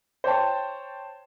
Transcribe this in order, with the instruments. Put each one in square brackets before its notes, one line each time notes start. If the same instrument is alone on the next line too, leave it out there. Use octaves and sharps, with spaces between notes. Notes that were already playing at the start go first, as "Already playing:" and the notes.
[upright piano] C5 C#5 G5 A5